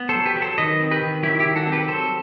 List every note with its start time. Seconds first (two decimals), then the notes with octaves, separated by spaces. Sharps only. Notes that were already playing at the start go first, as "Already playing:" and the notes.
Already playing: B3
0.09 A4 C5
0.15 F#3
0.26 G4 B4
0.36 F#3
0.42 A4 C5
0.58 D#3 B4 D#5
0.81 C4
0.91 G4 B4
1.02 D#3
1.23 F#3 E4 G4
1.39 E4 G4
1.46 D#3
1.56 F#4 A4
1.67 C4
1.72 G4 B4
1.88 F#3 A4 C5